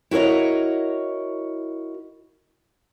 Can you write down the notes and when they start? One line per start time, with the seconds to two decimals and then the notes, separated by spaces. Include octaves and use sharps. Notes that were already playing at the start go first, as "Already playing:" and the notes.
0.11 E4 F#4 A#4 C#5 D#5